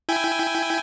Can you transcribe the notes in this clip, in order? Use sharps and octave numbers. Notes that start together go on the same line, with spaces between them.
E4 G5 G#5